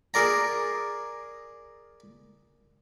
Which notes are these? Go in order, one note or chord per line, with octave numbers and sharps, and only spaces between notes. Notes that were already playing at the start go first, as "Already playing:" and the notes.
G#4 A#4 D5 A#5